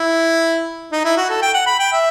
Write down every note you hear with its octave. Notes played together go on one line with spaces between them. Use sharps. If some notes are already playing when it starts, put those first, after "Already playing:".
Already playing: E4
D#4
E4
F#4
A4
G5
F#5
B5
G5
E5